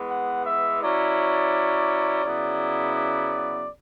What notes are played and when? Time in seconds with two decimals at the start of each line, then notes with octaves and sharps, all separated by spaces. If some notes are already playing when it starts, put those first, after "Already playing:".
Already playing: E3 G#3 B3
0.10 F#5
0.46 E5
0.82 F#3 C#4 E4 D5
2.24 C#3 F#3 B3 E4
2.95 D5